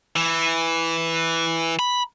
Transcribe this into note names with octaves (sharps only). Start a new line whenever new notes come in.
E3
B5